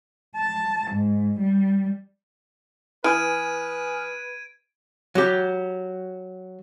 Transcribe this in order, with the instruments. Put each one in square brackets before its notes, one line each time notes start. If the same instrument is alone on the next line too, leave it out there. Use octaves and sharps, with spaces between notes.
[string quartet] A5
G#2
G3
[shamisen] E3 [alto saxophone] B4 [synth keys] G#5 D#6 F6 [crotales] G#6 D7 D#7
[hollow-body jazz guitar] F#3 G4